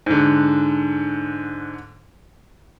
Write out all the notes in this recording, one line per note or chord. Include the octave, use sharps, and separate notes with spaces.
G#2 D3